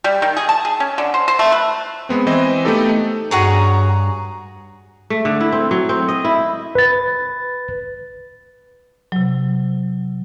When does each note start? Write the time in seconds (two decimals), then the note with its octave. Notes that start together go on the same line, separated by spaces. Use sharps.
0.04 G3
0.22 D#3
0.37 G#4
0.49 A5
0.65 G#4
0.80 C#4
0.98 D3
1.14 C5
1.28 C5
1.39 A3
1.52 B4
2.09 G#3 B3 C4
2.27 E3 C4 E4 D#5
2.65 A3 B3 D#4 G4 A4
3.31 G2 F#4 G#4 C#5 A#5
5.10 A3
5.25 D3
5.40 E4
5.52 C4
5.71 F#3
5.89 C4
6.08 D#5
6.25 E4
6.75 B4 A6
9.12 C3 F#3